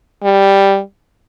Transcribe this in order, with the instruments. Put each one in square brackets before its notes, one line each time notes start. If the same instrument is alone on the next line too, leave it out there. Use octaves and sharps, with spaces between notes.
[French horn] G3